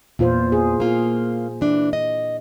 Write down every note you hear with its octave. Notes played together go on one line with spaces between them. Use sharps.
E2 A#2 F4 C5
G#4
A#3 F4
E3 D4
D#5